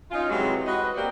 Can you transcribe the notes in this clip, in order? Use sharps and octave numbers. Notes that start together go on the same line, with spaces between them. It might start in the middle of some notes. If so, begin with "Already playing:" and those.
C#4 D#4 F4
C3 E3 F#3 G#3
F#4 B4 D#5
A#3 C4 F#4 G4 D5